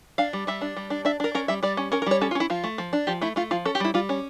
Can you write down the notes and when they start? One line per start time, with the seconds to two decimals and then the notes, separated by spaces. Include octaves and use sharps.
0.18 D4 F5
0.33 G3
0.47 G3 E5
0.61 D4
0.77 G3
0.90 D4
1.05 D4 E5
1.20 D4 A#4
1.35 C#4 A#4
1.48 G3 E5
1.63 G3 D5
1.77 C#4
1.92 C#4 A#4
2.02 A#4
2.06 G3 C#5
2.21 C#4 A4
2.31 F4
2.35 C#4 E4
2.50 F3 F4
2.64 A3
2.78 F3
2.93 D4
3.07 F3 G4
3.21 A3 E4
3.36 A3 F4
3.51 F3 F4
3.65 C#4 A4
3.75 G4
3.80 G3 E4
3.94 G3 F4
4.09 C#4